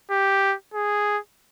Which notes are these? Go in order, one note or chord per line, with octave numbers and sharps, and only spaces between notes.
G4
G#4